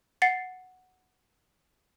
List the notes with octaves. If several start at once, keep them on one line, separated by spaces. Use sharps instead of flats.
F#5 A6 C7 C#7